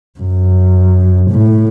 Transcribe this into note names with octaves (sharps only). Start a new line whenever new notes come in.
F#2
A2